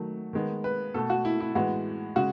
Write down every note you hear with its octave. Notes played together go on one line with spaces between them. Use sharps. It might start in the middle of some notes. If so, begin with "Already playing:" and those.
Already playing: D#3 F#3 A3
D#3 G#3 B3
B4
B2 A3 A4
F#4
E4
E4
A2 E3 G#3 B3 F#4
C#3 G#3 F#4